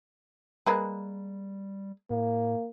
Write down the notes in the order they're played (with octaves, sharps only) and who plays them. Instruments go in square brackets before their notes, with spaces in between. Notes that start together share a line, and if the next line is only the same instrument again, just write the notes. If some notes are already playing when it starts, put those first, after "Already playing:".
[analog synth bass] G3 [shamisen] G#3 A#3 B4
[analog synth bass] A2 [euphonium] A#3